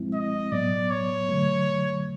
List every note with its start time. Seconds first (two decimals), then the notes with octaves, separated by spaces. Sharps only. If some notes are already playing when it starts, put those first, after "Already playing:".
Already playing: F3 G#3 C4 E4
0.14 D#5
0.52 A2 F#3 B3 D5
0.91 C#5
1.29 D3 F#3 A3